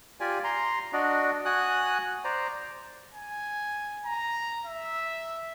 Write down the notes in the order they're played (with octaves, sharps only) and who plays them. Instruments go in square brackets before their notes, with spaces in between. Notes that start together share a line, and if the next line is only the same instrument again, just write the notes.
[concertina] F4 G4 D5 G#5
A#5 C6
D4 F#4 D5 D#5
F#4 G#5 D#6 F#6
C5 D5 A#5
[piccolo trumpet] G#5
A#5
E5